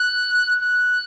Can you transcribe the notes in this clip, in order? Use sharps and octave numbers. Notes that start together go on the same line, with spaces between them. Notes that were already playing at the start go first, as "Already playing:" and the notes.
Already playing: F#6
F#6